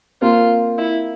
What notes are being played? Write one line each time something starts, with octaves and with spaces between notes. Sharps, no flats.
A#3 C4 F4
E4